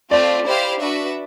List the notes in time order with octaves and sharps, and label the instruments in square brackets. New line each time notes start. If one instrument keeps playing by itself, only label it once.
[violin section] A3 C4 F4 [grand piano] D5
[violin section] E4 G4 C5 F5
D4 F#4 B4 E5